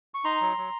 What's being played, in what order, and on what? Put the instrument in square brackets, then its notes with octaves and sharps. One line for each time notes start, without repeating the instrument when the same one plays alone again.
[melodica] C#6
D#4 A#5 C6
F#3
F#3